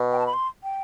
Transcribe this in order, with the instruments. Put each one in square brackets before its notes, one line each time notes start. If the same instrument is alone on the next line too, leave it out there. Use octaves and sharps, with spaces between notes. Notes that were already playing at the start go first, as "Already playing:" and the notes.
Already playing: [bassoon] B2
[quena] G5
A5
B5
C6
G5